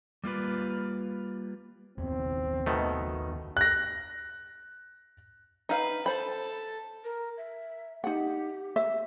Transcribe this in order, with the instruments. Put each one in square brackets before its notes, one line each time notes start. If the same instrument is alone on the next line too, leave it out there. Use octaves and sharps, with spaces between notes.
[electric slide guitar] G3 A#3 F4 B4
[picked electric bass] F#1 D#2 B3 [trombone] C4
[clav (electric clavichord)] B2 D#3 A3
[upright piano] F#6 A#6
[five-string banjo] D#4 F5 [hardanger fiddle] B4
[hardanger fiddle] A4 A5 [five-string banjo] C5 B5
[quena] A#4
E5
[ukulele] D#4 F#5 [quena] G4
[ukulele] E5